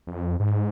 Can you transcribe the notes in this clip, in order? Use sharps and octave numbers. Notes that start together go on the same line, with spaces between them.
F2
G#2